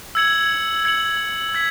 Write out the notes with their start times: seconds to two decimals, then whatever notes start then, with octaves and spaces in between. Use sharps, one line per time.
0.15 E6 G#6 C#7 F#7
0.85 G#6 C#7 F#7
1.55 G#6 B6